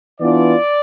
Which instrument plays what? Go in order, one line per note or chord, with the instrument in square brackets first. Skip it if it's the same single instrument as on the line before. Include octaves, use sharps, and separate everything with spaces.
[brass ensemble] E3 B3 D4 F4 D5